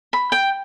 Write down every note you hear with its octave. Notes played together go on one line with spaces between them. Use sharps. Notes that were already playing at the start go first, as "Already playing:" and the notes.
B5
G5